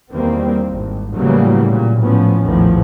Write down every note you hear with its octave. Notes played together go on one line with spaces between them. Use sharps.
E2 D#3 G3 A#3 C4
G#1
A2 C#3 E3 F#3 G3 A#3
A#2
A2 F3 B3 C#4
A#1 E2 A2 D#3 F3